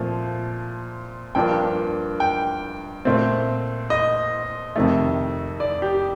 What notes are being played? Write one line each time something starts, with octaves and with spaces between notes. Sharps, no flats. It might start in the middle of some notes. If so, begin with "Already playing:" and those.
Already playing: A#2 F3 A3 C4
G2 F3 A#3 D4 G5
G5
A#2 A3 C4
D#5
F2 C3 D#3 A3
D5
G4